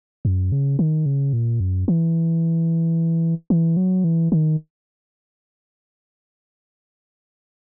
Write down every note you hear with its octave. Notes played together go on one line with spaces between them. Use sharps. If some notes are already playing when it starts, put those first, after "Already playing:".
F#2
C#3
D#3
C#3
A#2
F#2
E3
E3
F#3
E3
D#3